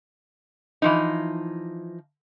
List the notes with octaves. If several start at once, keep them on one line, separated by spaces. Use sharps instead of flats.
E3 F3 D#4